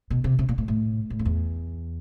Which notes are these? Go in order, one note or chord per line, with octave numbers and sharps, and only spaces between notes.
B2
C3
C3
A#2
A2
A2
A2
F2
E2